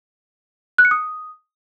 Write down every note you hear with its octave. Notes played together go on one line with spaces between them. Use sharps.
F#6
C#7
D#6